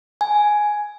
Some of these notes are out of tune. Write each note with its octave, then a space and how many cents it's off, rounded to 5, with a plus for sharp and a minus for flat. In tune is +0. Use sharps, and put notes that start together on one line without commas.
G#5 +5